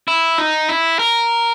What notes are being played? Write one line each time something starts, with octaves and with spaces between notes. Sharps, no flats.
E4
D#4
E4
A#4